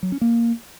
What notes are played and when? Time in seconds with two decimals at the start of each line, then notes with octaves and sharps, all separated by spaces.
0.03 F#3
0.12 C#4
0.21 A#3